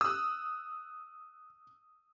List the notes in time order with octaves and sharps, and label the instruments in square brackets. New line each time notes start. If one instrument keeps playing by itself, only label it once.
[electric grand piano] D#6 [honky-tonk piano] E6 F#6